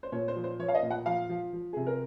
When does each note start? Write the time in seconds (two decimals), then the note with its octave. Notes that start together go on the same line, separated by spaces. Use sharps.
0.03 C5
0.12 A#2 C#5
0.28 C5
0.36 F3
0.44 C5
0.59 F3 C#5
0.68 F5
0.75 D#5
0.83 A#2
0.91 F#5
1.06 F3 F5
1.29 F3
1.53 F3
1.73 C3 G#4
1.87 A#4